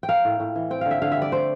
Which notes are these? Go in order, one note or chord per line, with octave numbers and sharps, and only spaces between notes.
G5
A#3 F5
A2
A2
E3
C4 G5
D3 F5
E5
D3 F5
E5
G3
D5
A3 C5